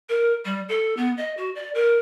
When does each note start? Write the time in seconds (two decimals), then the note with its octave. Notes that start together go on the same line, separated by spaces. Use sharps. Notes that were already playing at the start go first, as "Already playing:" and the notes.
0.09 A#4
0.45 G3
0.69 A4
0.97 B3
1.17 D#5
1.37 F#4
1.55 D5
1.75 A#4